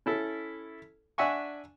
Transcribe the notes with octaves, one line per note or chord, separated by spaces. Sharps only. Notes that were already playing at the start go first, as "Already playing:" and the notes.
C#4 E4 A4
D4 E5 F#5 G#5 C#6